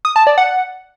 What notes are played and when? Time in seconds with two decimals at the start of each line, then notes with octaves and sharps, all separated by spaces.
0.05 D#6
0.16 A5
0.27 D5
0.38 F#5